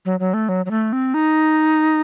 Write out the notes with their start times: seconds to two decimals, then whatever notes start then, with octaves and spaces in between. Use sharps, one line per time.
0.05 F#3
0.20 F#3
0.34 A3
0.49 F#3
0.66 F#3
0.71 A3
0.93 C4
1.14 D#4